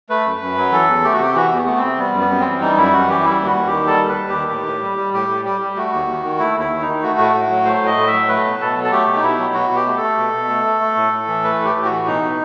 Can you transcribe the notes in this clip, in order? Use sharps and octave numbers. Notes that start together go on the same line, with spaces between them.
A3 B4
F#2
F#2
F#3
E3 A4
E2
A3 G4
F#4
C3 G4
E3 F#4
E2
B3
A3
C4
C3
G3 B3
F#2
B3
F#2
C4
E3
G3 D#4
F#2 E4
F#2 F#4
E3 G4
G3 E4
D#2
F#4
D#2
D#3 G4
G3 A4
D#2
B4
D#2
G4
D#3
A2
A2
G3
G3
A2 G4
A2
G3 G4
G3
A3 F#4
D#2
D#2
D#3
A3 E4
D#2 E4
D#2
D#4
D#3
A3 F#4
A2
A2
F#3
A3 C5
A2 D#5
A2
E5
F#3
A3 B4
B2
B2 A4
F#3
A4
A3 G4
B2
D#4
B2 E4
F#3
B2 F#4
B2
G4
A3
A4
A3
B2
B2
A3
A3
A3
A2
A2
E3
A3 B4
A2
G4
A2
F#4
E3
B2 D#4
B2